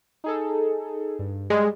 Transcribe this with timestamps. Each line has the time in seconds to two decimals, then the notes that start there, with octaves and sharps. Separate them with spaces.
0.24 D#4 G#4 A4
1.19 G2
1.50 G3 G#3